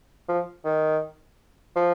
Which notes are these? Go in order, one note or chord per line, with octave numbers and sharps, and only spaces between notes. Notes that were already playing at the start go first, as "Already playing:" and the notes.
F3
D#3
F3